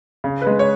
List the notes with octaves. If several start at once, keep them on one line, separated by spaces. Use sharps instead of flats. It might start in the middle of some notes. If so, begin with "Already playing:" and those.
C#3
B4
G#3
C#5